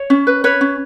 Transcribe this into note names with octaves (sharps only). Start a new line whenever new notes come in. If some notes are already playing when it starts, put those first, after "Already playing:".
Already playing: C#5
C#4
B4
B4 C#5
C#4